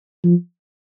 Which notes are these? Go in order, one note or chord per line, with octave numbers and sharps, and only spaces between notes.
F3